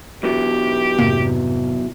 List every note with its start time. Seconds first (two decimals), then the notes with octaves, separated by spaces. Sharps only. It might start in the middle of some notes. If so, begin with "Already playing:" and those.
0.23 B1 B2 E3 G4
0.99 F2 G#2 C3 A#3